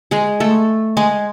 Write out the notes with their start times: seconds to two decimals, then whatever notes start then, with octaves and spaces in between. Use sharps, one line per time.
0.11 G#3 G#4
0.40 A3 A4
0.97 G#3 G#4